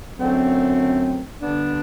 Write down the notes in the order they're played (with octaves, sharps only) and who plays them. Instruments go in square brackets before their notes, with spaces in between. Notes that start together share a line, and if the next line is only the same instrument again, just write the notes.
[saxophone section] F#2 D3 A3 C4
D3 G3 B3 D4